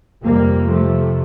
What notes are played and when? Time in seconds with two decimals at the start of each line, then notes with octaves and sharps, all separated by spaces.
0.23 F2 C3 G3 A#3
0.68 F3 A3